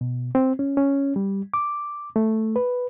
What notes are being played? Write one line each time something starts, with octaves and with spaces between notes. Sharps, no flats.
B2
C4
C#4
C#4
G3
D6
A3
B4